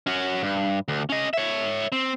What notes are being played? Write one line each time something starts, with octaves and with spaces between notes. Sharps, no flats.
C#4 F#4
G2
D2
C#4 D#5
C#5 E5
C4